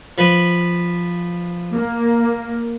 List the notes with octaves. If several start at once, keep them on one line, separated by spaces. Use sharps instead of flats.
F3 B4
A#3